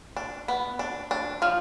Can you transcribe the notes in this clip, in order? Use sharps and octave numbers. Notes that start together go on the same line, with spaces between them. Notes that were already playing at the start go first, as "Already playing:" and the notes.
D4
B3
D4
D4
F3 F4